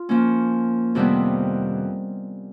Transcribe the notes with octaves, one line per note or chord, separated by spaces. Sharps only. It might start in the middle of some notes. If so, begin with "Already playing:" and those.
Already playing: F4
F3 A#3 C#4
F2 C3 D#3 G3 B3